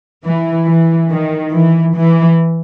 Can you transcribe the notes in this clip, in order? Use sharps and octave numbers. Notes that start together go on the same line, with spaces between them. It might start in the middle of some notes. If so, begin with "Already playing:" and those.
E3
E3
D#3
E3
E3